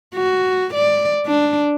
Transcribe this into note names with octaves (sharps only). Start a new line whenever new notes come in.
F#4
D5
D4